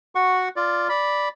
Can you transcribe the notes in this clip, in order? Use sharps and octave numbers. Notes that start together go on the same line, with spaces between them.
F#4 F#5 C#6
F4 D5
D5 B5